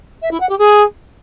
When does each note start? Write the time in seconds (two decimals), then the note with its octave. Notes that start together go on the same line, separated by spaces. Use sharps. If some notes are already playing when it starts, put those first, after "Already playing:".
0.22 E5
0.31 E4
0.40 F#5
0.49 G4
0.58 G#4